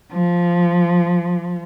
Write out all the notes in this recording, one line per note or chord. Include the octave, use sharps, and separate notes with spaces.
F3